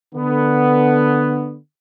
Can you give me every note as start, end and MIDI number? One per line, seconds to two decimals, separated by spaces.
0.14 1.56 50
0.14 1.56 59